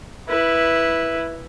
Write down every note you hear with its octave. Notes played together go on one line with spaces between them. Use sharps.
E4 B4